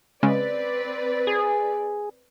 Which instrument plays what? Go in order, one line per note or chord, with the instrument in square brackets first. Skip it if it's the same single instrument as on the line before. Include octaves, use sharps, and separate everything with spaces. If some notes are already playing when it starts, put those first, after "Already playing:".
[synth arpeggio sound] C#3 G#3 C#4 [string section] C4 B4 D5
[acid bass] G#4